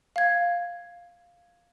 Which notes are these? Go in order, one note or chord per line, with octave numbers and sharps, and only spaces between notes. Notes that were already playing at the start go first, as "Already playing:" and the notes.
F5 G#6